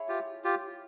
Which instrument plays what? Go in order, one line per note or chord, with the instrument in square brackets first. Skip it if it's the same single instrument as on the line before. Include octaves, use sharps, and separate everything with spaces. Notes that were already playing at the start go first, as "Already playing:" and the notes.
Already playing: [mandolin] E4 G#4 C#5
[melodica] F4 G4
F4 G4